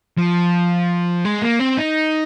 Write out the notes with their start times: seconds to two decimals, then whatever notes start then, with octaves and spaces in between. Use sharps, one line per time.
0.18 F3
1.26 G#3
1.43 A#3
1.60 C4
1.78 D#4